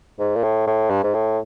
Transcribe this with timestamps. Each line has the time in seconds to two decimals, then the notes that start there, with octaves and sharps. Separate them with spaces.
0.19 G#2
0.36 A#2
0.44 A2
0.67 A2
0.90 G2
1.04 G#2
1.14 A2